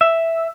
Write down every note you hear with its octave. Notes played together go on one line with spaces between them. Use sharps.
E5